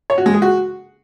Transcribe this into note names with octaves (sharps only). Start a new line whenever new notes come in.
C#5
F#4
G#3
G#4
F#4